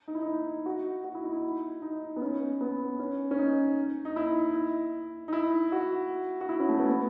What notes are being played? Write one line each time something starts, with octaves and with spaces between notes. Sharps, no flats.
D#4
E4
D#4
F#4
F#4
E4
D#4
E4
D#4
B3
C#4
B3
C#4
C#4
D#4
D#4
E4
E4
D#4
E4
F#4
F#4
E4
C#4
A3
B3
B3